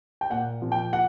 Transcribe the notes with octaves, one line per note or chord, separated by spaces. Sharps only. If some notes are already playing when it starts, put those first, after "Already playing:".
G5
A#2 F#5
F3
G5
F#5